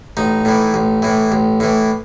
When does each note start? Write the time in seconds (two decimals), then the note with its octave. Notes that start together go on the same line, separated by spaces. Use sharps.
0.17 A1 D#4
0.45 A2 E3
0.74 A1
1.02 A2 E3
1.32 A1
1.60 A2 E3